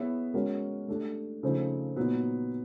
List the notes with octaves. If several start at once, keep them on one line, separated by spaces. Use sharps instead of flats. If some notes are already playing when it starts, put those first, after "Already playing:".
Already playing: B3 E4 G#4 C#5 E5
G#3 C#4 F#4 A#4
A3 D4 G4
C#3 F3 A3 C4 D#4
A#2 F#3 B3 D#4